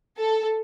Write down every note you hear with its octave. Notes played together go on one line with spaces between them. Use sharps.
A4